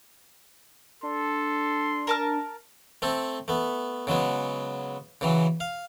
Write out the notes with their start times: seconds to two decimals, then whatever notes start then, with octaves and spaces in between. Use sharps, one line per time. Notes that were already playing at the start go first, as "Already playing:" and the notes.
1.03 D4 A4 C6
2.07 A#4 A5 F6
3.02 A3 C4 A4
3.48 A3 B3
4.07 C#3 F#3 G#3 B3
5.21 C#3 E3 F#3
5.60 F5